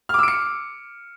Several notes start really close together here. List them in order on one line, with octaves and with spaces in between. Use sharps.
F6 D6 E6 D7 C#7